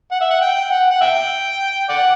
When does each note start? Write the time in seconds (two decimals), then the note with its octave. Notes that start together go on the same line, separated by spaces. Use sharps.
0.11 F#5
0.21 E5
0.30 F#5
0.41 G5
0.71 F#5
0.90 F#5
1.01 E5 G5
1.89 D5 F#5